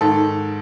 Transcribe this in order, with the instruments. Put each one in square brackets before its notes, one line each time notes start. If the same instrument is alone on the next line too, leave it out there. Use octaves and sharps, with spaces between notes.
[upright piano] G#2 D#3 A4